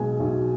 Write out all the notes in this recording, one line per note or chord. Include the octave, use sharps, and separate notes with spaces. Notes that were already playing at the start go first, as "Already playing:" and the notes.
Already playing: B1 B2 G#3 G#5
B1